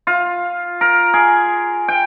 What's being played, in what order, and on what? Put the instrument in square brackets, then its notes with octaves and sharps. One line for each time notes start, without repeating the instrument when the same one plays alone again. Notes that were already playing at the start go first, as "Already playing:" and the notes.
[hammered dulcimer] F4
A#4
G#4
G5